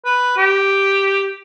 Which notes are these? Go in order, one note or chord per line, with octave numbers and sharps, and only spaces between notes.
B4
G4